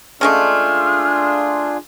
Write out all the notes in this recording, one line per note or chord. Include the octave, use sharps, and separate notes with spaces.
C#3 G#3 A3 D4 F4 G#4 F6